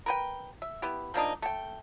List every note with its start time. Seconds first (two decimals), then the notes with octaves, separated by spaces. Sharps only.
0.06 A#4 B4 G5
0.62 E5
0.82 B3 E4 G4
1.14 F3 A#3 D4 D#4
1.42 A3 G5